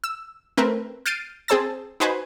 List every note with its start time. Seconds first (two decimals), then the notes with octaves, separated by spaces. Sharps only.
0.04 E6
0.57 A3 C4 A#4 B4
1.06 F6 G6 A6 C7 D7 D#7
1.48 C4 G#4 C5 A5 E6 A6
2.00 D#4 F#4 B4 C5 G#5